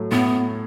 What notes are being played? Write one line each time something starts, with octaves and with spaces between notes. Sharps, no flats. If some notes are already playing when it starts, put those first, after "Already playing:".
Already playing: A2 F#3 A3
A2 B3